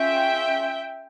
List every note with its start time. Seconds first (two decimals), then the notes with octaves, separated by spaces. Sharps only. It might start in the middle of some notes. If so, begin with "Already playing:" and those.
Already playing: C#4 F4 G#4 E5 G5